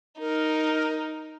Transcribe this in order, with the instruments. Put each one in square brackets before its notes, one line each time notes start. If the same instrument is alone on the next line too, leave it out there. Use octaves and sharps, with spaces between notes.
[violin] D#4 [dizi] A#4